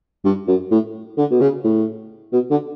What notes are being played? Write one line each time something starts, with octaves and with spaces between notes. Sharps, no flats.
G2
F#2
A2
D3
B2
C#3
A2
B2
D3